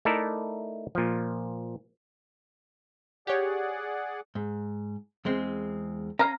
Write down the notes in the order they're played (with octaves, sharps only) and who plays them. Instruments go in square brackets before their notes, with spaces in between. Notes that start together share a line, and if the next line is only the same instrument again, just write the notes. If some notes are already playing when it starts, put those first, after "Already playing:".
[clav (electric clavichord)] A3 D#4 E4 A4 A#4 D5
A#2 F3
[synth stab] G4 C#5 [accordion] G#4 D5 F#5
[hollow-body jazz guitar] G#2
E2 G#3 C4
[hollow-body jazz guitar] C#4 [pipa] F5 A#5